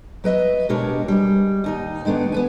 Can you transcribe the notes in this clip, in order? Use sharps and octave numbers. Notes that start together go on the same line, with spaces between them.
F#3 B4 D#5 E5
B2 G#3 D4 G4 A#4 C#5
G3 G#3
D#2 D#4 D#5
D#3 G#3 A3 B3 D4
B3 B4 G#5